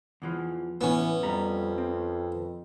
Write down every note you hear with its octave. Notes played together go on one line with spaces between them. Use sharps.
E2 E3 F3
A2 E3 B3 C#4
F2 G3 A#5
C4